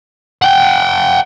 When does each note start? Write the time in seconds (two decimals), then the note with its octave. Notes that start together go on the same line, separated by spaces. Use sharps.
0.42 F#5 G5